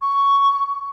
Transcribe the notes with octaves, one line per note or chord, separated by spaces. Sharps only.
C#6